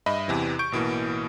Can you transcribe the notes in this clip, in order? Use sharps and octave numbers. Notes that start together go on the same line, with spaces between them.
G2 D#5 E5 B5
E2 C3 E3
C#6 G6 D7
A1 B2 E3 A#3